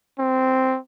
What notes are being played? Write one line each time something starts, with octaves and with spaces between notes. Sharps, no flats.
C4